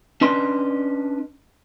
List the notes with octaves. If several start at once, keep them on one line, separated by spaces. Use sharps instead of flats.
C#4 D4 B4 D#5 C6